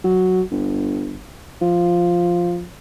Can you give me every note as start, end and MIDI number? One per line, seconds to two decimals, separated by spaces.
0.04 0.42 54
0.51 1.24 31
1.61 2.62 53